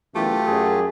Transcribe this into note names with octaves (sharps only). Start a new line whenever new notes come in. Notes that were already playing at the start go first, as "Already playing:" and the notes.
F#2 B2 E3 A3 F4 G4
F#2 G#4